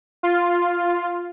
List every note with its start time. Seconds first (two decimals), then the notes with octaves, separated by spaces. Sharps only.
0.23 F4